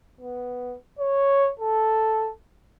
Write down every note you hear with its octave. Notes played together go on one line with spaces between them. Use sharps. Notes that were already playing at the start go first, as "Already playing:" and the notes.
B3
C#5
A4